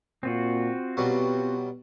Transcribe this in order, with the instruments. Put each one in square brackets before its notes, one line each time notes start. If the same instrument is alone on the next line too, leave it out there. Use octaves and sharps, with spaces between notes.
[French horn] A#2 [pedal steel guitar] C4 F4 F#4
[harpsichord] B2 F#3 G3 [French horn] B3